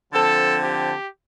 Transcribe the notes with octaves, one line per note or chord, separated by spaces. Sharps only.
D3 F3 C4 A4
G4